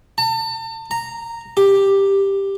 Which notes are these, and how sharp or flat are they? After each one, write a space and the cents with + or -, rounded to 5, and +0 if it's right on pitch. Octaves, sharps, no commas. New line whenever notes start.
A5 +40
A#5 -10
G4 +5